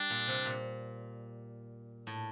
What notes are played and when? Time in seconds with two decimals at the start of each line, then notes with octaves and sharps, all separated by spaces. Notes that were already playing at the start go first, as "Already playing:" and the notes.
Already playing: G3 D4
0.10 A#2
0.28 C3
0.45 A#2
2.07 A2